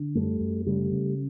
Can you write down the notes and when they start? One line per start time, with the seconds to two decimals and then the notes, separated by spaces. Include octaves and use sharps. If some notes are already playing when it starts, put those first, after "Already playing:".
Already playing: D3
0.15 F#2 G3 A3
0.40 F#2
0.66 C#3 G3 A3
0.91 C#3